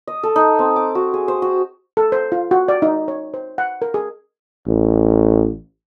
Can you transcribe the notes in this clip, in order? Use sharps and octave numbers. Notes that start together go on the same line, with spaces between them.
D#5
A4
D#4
C4
D6
F#4
G#4
C5
F#4
A4
C5
F4
F#4
D5
D#4
C#5
C5
F#5
A#4
G#4
A1